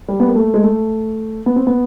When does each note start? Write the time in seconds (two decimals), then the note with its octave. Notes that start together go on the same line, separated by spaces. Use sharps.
0.08 G3
0.20 B3
0.28 A#3
0.36 A3
0.54 G#3
0.64 A3
1.46 B3
1.56 C4
1.67 B3